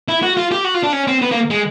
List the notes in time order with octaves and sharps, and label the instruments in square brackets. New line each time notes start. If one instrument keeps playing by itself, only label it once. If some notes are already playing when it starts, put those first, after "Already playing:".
[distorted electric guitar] E4
F#4
F4
G4
F#4
F4
D4
C#4
C4
B3
A#3
G#3